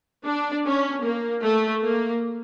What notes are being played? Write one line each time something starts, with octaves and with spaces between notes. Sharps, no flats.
D4
C#4
A#3
A3
A#3